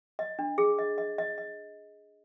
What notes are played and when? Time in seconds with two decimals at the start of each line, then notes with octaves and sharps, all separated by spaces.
0.19 D#5
0.39 D4
0.58 G#4
0.78 D#5
0.98 D#5
1.18 D#5
1.38 D#5